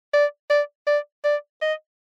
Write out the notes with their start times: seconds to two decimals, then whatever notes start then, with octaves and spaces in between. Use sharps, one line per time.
0.14 D5
0.50 D5
0.87 D5
1.24 D5
1.62 D#5